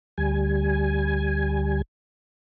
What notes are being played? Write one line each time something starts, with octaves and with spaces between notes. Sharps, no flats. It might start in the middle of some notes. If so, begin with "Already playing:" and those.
D2 G3 G#5